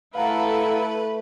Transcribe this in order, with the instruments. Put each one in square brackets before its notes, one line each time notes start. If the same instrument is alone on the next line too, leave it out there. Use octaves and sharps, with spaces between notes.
[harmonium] A3 [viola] E4 A4 [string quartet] B4 [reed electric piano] F5 F#5 A#5